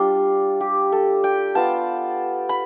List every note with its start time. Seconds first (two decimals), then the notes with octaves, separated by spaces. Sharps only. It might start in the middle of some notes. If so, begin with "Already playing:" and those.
Already playing: G3 D4 F4
0.61 G4
0.92 A4
1.24 G5
1.55 B3 F4 A5
2.49 B5